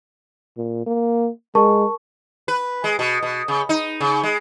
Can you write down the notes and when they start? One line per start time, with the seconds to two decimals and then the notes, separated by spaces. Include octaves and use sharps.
0.57 A#2
0.86 A#3
1.55 G#3 A#4 A5 C#6
2.48 B4
2.84 G#3
2.99 B2
3.22 B2
3.48 C#3
3.69 D#4
4.01 C#3
4.23 G#3